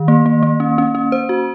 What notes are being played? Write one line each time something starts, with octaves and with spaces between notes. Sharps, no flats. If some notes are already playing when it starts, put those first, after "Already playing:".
Already playing: D#3
A#3
A#3
A#3
C#4
C#4
C#4
C5
F#4